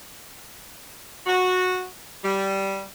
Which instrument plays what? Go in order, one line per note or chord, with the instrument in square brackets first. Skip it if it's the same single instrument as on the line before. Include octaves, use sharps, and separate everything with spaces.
[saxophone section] F#4
G3